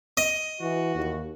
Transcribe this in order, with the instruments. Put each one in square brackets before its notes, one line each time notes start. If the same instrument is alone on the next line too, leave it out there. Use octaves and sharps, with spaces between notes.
[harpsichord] D#5
[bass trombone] E3 [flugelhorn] F#4
[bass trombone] D#2